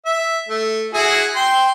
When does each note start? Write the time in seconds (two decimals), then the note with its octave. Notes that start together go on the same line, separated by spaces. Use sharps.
0.06 E5
0.49 A3
0.94 E4 F#4 G#4
1.35 G5 C6